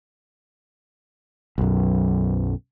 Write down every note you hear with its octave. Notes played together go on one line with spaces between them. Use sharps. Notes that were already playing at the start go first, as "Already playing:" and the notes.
B1 F#2